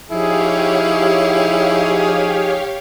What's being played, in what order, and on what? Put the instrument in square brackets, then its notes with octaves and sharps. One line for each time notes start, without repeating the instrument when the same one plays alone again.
[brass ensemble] F3 D#4 G#4 [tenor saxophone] E4 [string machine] G4 C#5 F5